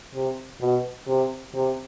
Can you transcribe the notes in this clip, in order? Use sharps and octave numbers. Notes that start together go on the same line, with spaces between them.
C3
B2
C3
C3